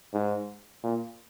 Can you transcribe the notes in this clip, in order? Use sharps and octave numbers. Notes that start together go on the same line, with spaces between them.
G#2
A#2